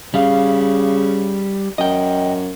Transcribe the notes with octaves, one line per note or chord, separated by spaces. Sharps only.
C#3 G3 F5
F#2 D#5 G5